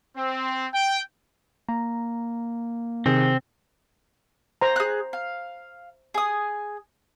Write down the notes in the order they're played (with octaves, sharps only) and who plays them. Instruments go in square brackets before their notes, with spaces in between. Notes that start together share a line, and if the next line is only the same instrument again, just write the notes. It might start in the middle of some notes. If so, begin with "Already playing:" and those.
[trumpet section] C4
G5
[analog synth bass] A#3 [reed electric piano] A#5
[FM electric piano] C3 [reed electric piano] D#3 G#4 [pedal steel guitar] C4
[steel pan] C5 A#5
[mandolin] G#4 F#6
F5
G#4 D#6